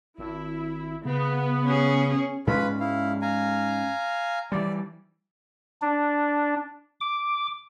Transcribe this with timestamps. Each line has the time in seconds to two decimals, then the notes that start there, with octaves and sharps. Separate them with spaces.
0.18 G#1 E4
1.05 C#3 B3
1.66 C#4 G#4
2.47 G#2 G#3 C#4 F4 B4 B5
2.80 E4 F5
3.22 F5 G#5 A#5
4.52 E3 G3 D5
5.82 D4
7.01 D6